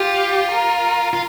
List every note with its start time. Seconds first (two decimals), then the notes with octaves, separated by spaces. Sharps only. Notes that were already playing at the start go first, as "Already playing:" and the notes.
Already playing: F4 G4
0.52 A#4
1.13 F4